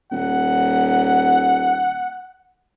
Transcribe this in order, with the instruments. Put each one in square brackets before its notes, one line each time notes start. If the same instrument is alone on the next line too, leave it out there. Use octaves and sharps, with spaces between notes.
[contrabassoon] D#1 [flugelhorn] F#5